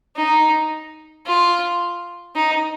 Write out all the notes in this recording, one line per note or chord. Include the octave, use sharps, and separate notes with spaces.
D#4
F4
D#4